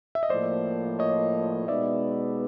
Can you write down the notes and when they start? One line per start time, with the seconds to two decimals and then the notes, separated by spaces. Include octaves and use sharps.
0.15 E5
0.23 D#5
0.30 A2 F3 A#3 C5 D5
0.99 C#5 D#5
1.68 B2 G#3 B3 D#4 D5 E5